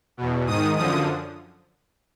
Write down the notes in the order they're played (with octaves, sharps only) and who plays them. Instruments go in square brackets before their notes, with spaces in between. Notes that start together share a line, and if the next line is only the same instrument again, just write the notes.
[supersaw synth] E2 B2
G#2 D#3 D#6
F#2 D3 F3 D#6